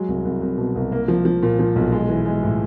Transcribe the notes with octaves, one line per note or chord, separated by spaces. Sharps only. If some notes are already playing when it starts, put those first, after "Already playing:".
Already playing: F#3 G#3
C2
C2
C2
B2
C2
A#3
F3
F3
A#2
F3
B1
G#3
E3
G#3
A2